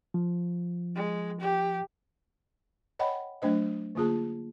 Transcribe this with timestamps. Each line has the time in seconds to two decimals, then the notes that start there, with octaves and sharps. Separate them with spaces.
0.14 F3
0.95 G#3
1.40 G4
2.99 C#5 D#5 F#5 G5 B5
3.42 F#3 A3 D4 C5 D#5
3.95 D3 A#3 F4 G#4 A5